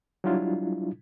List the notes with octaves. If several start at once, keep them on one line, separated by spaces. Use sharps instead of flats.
F#3 G3 D4 E4 F4